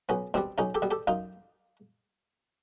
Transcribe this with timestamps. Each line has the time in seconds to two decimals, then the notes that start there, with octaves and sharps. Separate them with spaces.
0.09 B1 B3 C#4
0.34 B2 G3 C4 D4
0.58 B1 C#4 D#4
0.75 G4 A4
0.82 B2 G3
0.91 G4 A4
1.07 F#2 D#4 F4